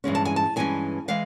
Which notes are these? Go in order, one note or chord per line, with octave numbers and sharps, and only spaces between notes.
G2 E3 G#3 C#4
A5
G#5
A5
G2 E3 G#3 C#4 G#5
E3 G#3 F5